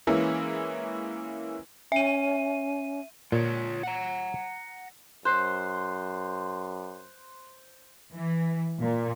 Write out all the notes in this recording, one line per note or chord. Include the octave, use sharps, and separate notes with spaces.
E3 G#3 A#3 C#4 E4
C#4 E5 D#7
A#2 F4 C#5
F#5 A#5
F#2 C5 F#6 C7
E3
A#2